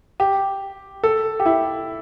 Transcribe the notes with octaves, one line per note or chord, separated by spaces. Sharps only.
G4
A4
G4
E4